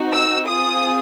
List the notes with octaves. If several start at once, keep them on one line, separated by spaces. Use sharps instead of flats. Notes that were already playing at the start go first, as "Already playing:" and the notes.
Already playing: C4 D#4 F#4
E6
C4 F4 G#4 D#6